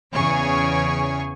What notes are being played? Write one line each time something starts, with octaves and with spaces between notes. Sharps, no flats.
E2 C#3 G#4 C#5 G#5 C#6